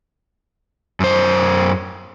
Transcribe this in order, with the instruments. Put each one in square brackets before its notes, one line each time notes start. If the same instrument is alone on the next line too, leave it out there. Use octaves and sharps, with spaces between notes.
[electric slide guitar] F#2 C5